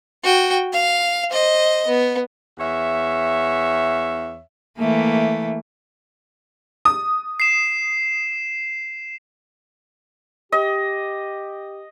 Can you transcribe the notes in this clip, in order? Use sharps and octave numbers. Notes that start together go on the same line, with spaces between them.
F#4 G5
F5
C5 D#5
B3
E2 C#5 E5
E3 A3 A#3
D#6
C7 E7
G4 D#5